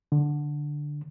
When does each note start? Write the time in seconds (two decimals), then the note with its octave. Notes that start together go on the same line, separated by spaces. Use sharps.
0.12 D3